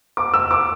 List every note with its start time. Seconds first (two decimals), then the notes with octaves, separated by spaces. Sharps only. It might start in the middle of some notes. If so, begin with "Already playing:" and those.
0.17 D6
0.34 E6
0.51 D6